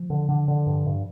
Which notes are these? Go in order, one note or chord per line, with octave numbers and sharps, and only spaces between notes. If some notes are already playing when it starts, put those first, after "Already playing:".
Already playing: F3
D3
D3
D3
G2
G2